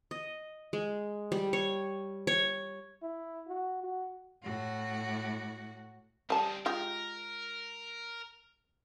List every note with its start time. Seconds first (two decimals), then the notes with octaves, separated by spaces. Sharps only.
0.11 D#5
0.73 G#3
1.32 G3
1.53 C#5
2.27 C#5
3.02 E4
3.48 F#4
3.84 F#4
4.43 A2 F#4
6.30 G3 C4 G#4 A5
6.66 G#3 F4 G4 A#4